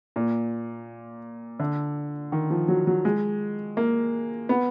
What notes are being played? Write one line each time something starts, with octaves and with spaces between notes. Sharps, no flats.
A#2
D3
D#3
F3
F#3
F#3
G#3
A#3
B3